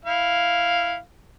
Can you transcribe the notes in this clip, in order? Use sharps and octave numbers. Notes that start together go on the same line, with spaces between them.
E4 F5